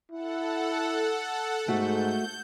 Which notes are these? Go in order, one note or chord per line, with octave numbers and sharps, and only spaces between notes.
E4 A4 F#5
G#2 A3 F#4 G6